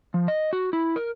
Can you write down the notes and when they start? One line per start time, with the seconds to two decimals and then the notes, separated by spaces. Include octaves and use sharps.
0.14 F3
0.28 D#5
0.53 F#4
0.73 E4
0.96 A#4